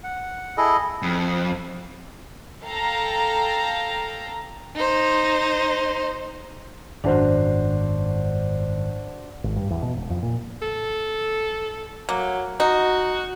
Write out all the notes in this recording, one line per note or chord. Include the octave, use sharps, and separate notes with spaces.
F#5
E4 G#4 A4 D#5
F2
A4 F5 G5 A#5
D#4 C5
G#1 F#2 D4 F#4 C5
G#1
G2
E2
B2
E1
F2
A#2
A4
F#3 A#3
D#4 F#4